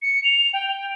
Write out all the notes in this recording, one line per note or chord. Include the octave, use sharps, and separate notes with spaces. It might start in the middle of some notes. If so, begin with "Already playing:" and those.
C#7
F7
G5